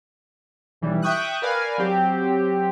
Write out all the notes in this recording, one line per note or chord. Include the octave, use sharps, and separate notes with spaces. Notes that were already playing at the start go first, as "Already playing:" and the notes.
B1 E3 G3
E5 G5 C#6 D#6 F#6
A#4 B4 D5 F5 G#5
F#3 C4 G4